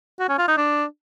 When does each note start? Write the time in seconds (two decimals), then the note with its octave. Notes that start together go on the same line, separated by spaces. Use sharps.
0.19 F#4
0.29 C#4
0.38 F4
0.48 D#4
0.57 D4